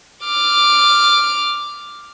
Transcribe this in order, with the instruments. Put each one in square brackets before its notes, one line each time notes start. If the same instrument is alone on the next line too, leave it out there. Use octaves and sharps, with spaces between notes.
[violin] D6 F6